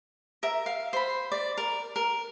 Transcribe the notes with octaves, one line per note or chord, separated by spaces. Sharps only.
A#4 E5
F5
C5 B5
D5
A#4
A#4